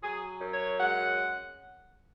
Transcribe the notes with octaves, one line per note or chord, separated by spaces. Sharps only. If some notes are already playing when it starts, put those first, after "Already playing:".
F#3 G#4
F#2
C#5
G#3 F#5